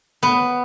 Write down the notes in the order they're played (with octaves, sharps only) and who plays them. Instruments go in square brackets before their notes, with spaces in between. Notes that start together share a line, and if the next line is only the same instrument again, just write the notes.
[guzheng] B3